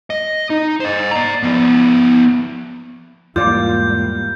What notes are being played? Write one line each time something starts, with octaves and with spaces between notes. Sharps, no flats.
D#5
D#4
C5 D#5
D5 A#5
F3 B3
E2 G#2 G3 A#3 F4 D5 G6